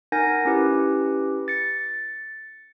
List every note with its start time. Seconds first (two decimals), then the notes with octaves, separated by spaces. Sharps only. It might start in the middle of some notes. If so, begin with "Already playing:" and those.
0.12 D#4 A#4 F#5 G#5 G6 A#6
0.45 C#4 E4 G4 B4
1.48 A6 C#7